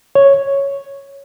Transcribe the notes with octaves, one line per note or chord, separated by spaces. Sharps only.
C#5